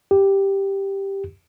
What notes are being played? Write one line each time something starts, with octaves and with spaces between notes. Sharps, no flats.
G4